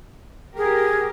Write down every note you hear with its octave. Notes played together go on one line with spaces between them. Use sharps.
G4 G#4 A#4